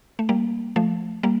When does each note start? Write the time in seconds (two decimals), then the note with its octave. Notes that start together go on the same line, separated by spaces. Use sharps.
0.19 A3
0.29 G3 A#3
0.76 F3 A3
1.23 G3 A#3